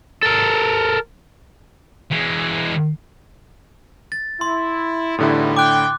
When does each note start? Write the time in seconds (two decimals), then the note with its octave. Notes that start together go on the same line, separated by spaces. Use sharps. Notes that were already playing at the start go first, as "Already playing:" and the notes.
0.23 A4 A#4
2.12 E3 G#3
4.12 A6
4.41 E4 C6
5.18 E2 A2 D3 G3 D#4 E4
5.57 G5 D6 F#6